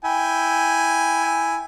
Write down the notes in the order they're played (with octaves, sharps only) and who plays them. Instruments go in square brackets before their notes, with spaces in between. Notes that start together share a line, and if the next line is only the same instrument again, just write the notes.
[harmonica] E4 G5 G#5